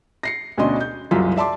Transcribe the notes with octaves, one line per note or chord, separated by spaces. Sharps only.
A#6 C7 C#7
D2 B2 C#4 D4 D#5 C6
G6
F#1 C2 F#2 F#3 F4 B6
D5 E5 A5 C6 D6